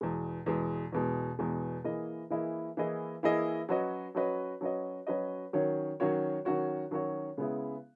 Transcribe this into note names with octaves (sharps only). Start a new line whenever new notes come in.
E2 B2 G#3
E2 B2 G#3
E2 B2 G#3
E2 B2 G#3
E3 A#3 E4 G#4 D#5
E3 A#3 E4 G#4 D#5
E3 A#3 E4 G#4 D#5
E3 A#3 E4 G#4 D#5
F#3 C#4 F#4 B4 D#5
F#3 C#4 F#4 B4 D#5
F#3 C#4 F#4 B4 D#5
F#3 C#4 F#4 B4 D#5
D#3 F#3 C#4 F#4 C#5
D#3 F#3 C#4 F#4 C#5
D#3 F#3 C#4 F#4 C#5
D#3 F#3 C#4 F#4 C#5
C#3 G#3 B3 E4 G#4